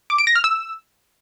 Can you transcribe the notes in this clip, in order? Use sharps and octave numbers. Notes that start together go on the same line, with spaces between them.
D6
D7
A#6
F6
E6